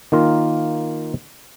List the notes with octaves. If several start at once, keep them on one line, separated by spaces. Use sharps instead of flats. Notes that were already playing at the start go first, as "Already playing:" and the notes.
D#3 A#3 F4 A#4